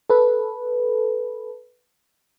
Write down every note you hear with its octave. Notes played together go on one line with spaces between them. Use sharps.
A4 B4